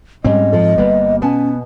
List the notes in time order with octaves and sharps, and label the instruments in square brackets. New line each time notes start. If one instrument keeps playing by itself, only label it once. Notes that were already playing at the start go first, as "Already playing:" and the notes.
[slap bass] G#2 C4 [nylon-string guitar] G3 C#4 [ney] D#5
[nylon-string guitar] F3 A4
[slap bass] G1 G3 A#3 [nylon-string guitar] B3
[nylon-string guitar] B2 G#5 A5 [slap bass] B3 [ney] C#4